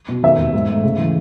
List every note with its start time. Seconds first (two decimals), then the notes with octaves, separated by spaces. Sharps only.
0.09 B2
0.23 D#3 E5
0.38 D#2
0.53 G#2
0.69 A3
0.83 C#3
0.98 E3